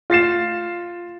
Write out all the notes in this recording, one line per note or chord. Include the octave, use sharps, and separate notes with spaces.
F4 A6 C7 E7